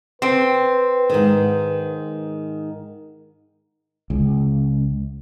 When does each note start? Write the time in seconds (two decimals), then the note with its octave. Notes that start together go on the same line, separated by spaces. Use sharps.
0.22 C4 B4
1.10 G#2 D#3
4.10 C#2